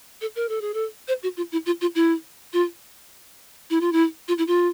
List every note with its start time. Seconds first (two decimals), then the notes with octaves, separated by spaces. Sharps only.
0.21 A4
0.36 A#4
0.49 A4
0.61 G#4
0.74 A4
1.08 C5
1.23 F#4
1.37 F4
1.52 E4
1.66 F4
1.81 F4
1.95 E4
2.53 F4
3.70 E4
3.81 F4
3.92 E4
4.28 F4
4.38 E4
4.47 F4